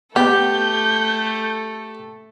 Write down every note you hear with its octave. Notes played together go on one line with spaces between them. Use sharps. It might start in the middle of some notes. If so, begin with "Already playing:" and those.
A3 B3 G4 A4 G6